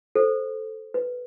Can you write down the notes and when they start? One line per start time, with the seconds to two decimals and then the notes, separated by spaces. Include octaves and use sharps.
0.15 A4 C5
0.94 B4